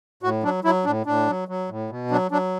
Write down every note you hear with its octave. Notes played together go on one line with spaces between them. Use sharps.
A2 F#4
F#3 D4
F#3 E4
A2 D4
A2 D4
F#3
F#3
A2
B2
F#3 D4
F#3 D4